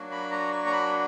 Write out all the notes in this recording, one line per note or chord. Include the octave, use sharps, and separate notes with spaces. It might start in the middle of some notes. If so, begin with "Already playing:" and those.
Already playing: F#3 A#3 D4 F#4
B5
A#5
C#6
A#5
B5